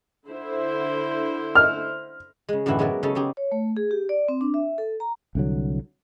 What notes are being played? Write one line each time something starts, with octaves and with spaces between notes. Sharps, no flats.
D3 E4 C5
F6
C#3 G#3
F#2 A2 D3 E3 E4 F#4
F#3 G#3 B3 E4 A#4 D5
C#3 C#4 D#4 A4
C#3 D#4 G4 G#4
C#5
A3
G#4
G4
D5
C4
D4
E5
A4
A#5
C2 D3 F#3